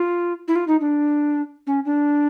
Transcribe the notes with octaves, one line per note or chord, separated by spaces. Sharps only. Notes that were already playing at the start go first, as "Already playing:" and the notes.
Already playing: F4
E4
F4
D#4
D4
C#4
D4